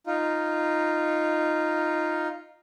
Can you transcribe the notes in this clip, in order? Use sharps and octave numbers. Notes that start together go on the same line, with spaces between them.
D#4 F4